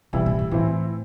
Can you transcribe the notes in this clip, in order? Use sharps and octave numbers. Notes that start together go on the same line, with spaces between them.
C3 E3 G3 E4
A2
A2
A2 E3 C4 E4